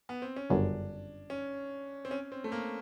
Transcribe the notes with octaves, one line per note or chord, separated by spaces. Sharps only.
B3
C4
C#4
G1 F#2 C#3 D4
C#4
C4
C#4
C4
A3
A#3